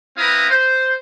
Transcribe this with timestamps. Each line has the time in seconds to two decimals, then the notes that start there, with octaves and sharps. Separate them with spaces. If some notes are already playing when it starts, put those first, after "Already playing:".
0.18 C4 E4 B4 F5 A#5 D#6
0.50 C5